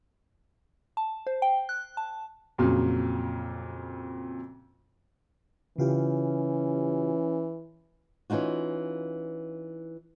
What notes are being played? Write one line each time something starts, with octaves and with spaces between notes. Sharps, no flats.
A5
C5
G5
F#6
A5
F2 A#2 C#3 F#3
C#3 E3 C#4 F4 G4
E3 C#4 D#4 F4 F#4